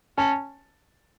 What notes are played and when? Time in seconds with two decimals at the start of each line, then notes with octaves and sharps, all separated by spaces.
0.18 C#4 A5